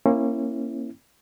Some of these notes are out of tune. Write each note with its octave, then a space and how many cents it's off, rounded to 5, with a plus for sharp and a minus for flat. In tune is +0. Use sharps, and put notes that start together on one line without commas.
A#3 +0 C#4 -30 E4 +0